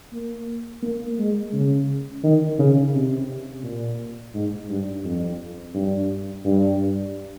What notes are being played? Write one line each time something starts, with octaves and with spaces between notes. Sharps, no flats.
A#3
A#3
G#3
C#3
D#3
C#3
C3
A#2
G#2
G2
F2
G2
G2